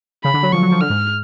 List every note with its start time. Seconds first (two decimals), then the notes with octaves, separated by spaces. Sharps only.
0.24 C#3 B5
0.34 D3
0.43 F#3
0.52 F3 C#6
0.62 F#3
0.71 F3
0.81 D3 F6
0.90 G#2